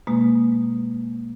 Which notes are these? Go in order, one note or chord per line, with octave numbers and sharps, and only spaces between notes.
B2 G#3 A#3